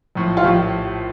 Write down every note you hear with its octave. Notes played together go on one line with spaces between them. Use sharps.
A#1 A2 F3
F4
A#1 A2 F3 G4